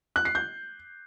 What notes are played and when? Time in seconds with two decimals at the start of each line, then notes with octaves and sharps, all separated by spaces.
0.16 F#6
0.25 C7
0.35 G6